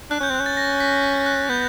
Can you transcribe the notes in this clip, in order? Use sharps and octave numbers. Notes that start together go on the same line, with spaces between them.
D4 F#6
C#4 G6
C4
F#6
C#4
A6
A#6
B6
F#6
B3 G6